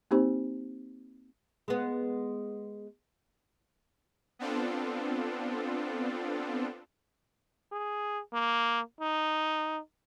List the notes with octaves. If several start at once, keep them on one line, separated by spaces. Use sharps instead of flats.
A#3 C4 D#4 G4 C5
G#3 B3
B3 C4 D4 F4 A4
G#4
A#3
D#4